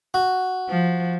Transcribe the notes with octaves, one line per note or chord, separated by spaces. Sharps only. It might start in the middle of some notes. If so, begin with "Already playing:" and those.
F#4
F3